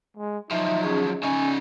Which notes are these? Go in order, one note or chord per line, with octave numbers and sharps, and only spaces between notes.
G#3
F3 F#3 D#4 E5
C#4 G#4
C#3 C#4 D#4 G#5